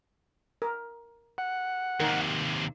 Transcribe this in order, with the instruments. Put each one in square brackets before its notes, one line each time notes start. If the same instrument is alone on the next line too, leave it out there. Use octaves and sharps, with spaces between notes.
[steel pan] A#4
[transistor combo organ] F#5
[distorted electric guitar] D#2 C3 [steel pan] D#4 A#4